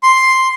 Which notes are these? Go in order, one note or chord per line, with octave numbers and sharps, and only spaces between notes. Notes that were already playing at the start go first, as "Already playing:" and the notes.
C6